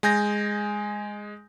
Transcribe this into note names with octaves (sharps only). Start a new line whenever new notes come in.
G#3 G#5 G6 A#6